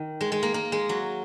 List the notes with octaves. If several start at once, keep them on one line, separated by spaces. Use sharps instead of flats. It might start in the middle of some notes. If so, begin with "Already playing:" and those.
Already playing: D#3
G#3
G#3
A#3
A#3
G#3
F#3